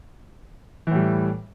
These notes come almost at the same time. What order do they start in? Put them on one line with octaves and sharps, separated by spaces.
E3 A2 G3